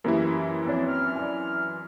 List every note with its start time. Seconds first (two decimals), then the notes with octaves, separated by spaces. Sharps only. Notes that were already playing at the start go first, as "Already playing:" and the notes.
0.04 F#2 E3 A#3 E4 G4
0.66 F3 C4 D4 C#5
0.89 F6
1.16 D5 G#5